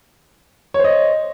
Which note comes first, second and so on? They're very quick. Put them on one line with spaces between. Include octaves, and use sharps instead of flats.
C#5 C5 D#5